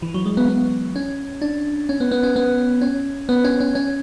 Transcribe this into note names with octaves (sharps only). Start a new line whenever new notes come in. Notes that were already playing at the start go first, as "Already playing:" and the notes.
E3
F#3
G#3
B3
B3
C#4
D4
C#4
B3
B3
C#4
B3
C#4
B3
C#4
C#4
C#4